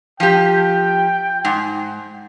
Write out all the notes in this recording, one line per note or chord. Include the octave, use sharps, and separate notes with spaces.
F3 G4 G5
G#2